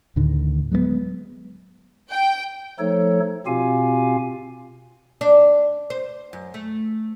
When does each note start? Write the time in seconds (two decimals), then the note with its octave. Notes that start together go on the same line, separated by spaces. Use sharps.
0.16 D2 A2 D3 D#3
0.72 F#3 G#3 A3 B3
2.11 G5
2.79 F3 A3 D#4 A4 C#5
3.47 B2 C4 F4 G4 F5 G#5
5.21 D4
5.90 C5
6.33 F#2
6.54 A3